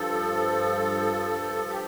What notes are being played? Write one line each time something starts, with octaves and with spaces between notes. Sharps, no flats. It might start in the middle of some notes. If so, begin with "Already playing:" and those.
Already playing: G2 F3 A4
G4